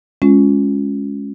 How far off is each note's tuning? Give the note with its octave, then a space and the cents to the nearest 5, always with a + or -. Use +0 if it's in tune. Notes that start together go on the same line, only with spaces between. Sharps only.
G#3 +0 C#4 +0 F4 +0